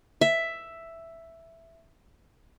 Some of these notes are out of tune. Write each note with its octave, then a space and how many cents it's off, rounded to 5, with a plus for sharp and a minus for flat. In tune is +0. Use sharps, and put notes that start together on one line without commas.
E5 +5